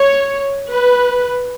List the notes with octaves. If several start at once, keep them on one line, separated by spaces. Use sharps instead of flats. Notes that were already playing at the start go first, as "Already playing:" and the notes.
Already playing: C#5
B4